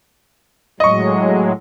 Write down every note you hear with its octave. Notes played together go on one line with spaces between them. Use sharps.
A2 F#3 G#3 D#5 C#6